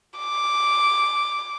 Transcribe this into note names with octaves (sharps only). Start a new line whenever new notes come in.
D6